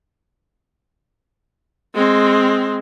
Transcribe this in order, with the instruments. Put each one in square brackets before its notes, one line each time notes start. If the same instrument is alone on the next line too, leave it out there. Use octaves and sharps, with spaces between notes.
[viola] G#3 C4